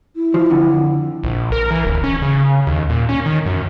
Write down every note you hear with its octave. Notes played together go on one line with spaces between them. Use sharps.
E4
F3
F2 D3
A#1
A#4
E3
D1
C#4
C#3
D#2
A#2
C#4
D#3
F#2